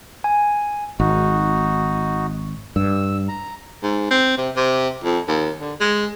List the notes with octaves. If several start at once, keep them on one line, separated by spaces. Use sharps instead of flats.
G#5
G#1 D#4 F#4
G2 E6
A#5
G#2
C4
C3
C3
F2
D#2
D3
G#3